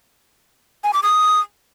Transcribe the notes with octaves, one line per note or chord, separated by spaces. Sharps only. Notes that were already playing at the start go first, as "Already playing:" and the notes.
G#5
D6
D#6